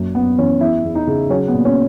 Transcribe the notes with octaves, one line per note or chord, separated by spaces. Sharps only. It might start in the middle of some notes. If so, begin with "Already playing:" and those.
Already playing: F#2 A#2 F#3
F#2 B3
E3 C#4
E2 E4
E2
D#4
C#3
F#3 C#4
B3
A#2
C#4